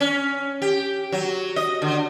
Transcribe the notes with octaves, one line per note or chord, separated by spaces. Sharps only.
C#4
G4
F#3
D#5
D3